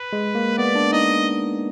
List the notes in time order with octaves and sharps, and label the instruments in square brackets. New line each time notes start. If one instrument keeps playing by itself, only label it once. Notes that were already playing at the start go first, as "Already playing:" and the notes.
Already playing: [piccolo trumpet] B4
[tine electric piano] G#3
A#3
[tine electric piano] B3 [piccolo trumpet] D5
[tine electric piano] D4
[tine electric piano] D#4 [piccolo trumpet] D#5